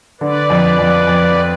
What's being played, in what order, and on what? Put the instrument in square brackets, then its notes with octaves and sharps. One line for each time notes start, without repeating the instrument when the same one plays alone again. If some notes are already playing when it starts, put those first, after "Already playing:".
[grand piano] D3 [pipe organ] B4 D5
[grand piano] F2
F2
F2